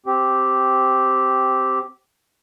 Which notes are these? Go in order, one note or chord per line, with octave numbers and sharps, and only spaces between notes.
C4 G4